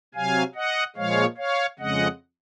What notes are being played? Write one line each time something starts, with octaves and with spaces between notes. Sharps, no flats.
C3 F#3 F5 G#5
D#5 F#5
A#2 F3 G#3 C#5 F5
C#5 F5
F2 C#3 G#3 D#5 F#5